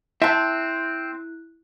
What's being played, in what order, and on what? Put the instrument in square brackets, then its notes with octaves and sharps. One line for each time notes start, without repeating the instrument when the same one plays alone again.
[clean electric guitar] C4 [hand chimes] E4 F#6 [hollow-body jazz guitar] E5 A5